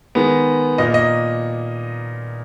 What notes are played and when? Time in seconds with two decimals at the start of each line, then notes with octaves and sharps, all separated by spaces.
0.15 D#3 G#3 B3
0.78 A#2 A#3 D#5
0.94 D#5